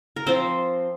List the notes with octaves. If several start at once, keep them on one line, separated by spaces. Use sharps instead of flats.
A#4
F3 C4 C5